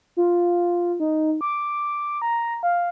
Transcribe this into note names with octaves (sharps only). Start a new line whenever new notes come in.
F4
D#4
D6
A#5
F5